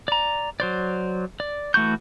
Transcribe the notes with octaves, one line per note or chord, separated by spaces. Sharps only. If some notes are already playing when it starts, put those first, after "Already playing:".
D5 A#5
F#3 C5 D5
D5
E3 A3 F#4 C#6 G6